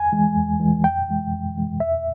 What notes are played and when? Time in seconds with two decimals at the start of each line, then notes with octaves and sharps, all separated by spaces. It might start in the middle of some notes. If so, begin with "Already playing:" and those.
Already playing: E2 G#5
0.12 E3 G#3
0.36 E2
0.60 E3 G#3
0.84 F2 G5
1.08 E3 G#3
1.32 F2
1.55 E3 G#3
1.80 E2 E5